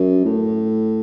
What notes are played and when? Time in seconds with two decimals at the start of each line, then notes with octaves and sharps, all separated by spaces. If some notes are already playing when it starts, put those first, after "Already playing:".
Already playing: F#2
0.25 A2